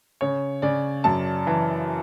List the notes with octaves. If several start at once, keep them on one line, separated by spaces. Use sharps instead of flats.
C#3 C#5
C#3 D5
F#2 A5
E3